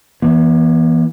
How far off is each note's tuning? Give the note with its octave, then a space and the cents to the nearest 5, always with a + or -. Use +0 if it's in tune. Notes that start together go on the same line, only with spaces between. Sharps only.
E3 +0 B3 -45